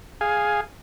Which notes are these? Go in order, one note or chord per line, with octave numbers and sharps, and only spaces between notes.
G#4 F5 G#5